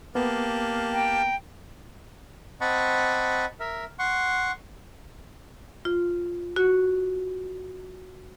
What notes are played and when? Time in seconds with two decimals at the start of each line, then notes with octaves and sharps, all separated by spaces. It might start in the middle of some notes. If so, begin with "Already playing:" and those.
0.15 A#3 B3 G4 F5 A5
0.91 G5 A#5
2.61 C4 D#5 F#5 A5 B5 C#6
3.60 A#4 E5
3.99 F#5 C6 C#6
5.85 F4
6.56 F#4